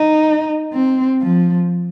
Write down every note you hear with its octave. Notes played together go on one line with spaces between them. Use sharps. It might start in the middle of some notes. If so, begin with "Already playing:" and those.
Already playing: D#4
C4
F3